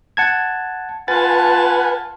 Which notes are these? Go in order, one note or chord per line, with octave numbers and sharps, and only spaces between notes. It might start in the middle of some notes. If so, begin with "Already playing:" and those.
F#5 A5 G#6
F4 B4 F#5 G#5 A5 A6